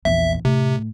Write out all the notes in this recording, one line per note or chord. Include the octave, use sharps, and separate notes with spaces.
A#1 E2 E5
A2 C3